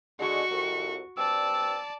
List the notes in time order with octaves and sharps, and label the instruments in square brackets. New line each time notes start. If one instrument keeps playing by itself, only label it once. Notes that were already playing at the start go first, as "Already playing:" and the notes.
[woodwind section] D3 G#3 [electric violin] F#4 C#6
[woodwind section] C2 F2
[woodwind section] G2 C4 E6 [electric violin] D5 A5